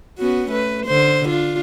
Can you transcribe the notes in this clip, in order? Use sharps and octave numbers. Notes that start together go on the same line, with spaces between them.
B3 C#4 F#4
A3 B4
D3 C5
D4 F4